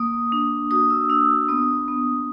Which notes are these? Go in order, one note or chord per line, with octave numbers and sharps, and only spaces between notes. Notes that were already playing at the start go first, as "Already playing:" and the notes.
Already playing: A#3 D#6
D4
F#4 D#6
E6
D4 E6
B3 D#6
B3